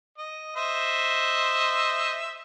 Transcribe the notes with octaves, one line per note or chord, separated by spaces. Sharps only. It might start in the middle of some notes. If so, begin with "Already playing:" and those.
D#5
C5 D#5 E5